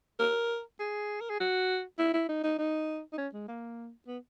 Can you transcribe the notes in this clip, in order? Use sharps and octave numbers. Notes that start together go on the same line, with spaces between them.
A#4
G#4
A#4
G#4
F#4
E4
E4
D#4
D#4
D#4
D#4
C#4
G#3
A#3
B3